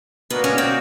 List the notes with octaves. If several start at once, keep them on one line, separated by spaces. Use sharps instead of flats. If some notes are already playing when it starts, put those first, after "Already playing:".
A#3 B3 D4 F#4 A#4 D#5
C#4
C4